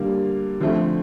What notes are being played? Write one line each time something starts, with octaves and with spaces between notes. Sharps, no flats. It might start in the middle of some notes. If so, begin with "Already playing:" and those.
Already playing: D3 G3 A#3
D3 F3 A3 C4